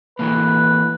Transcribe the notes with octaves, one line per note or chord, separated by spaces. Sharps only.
E3 A3 A#3 B4